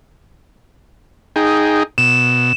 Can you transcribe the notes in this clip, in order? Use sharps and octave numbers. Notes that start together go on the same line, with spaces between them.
D#4 G#4 G5
B2 E7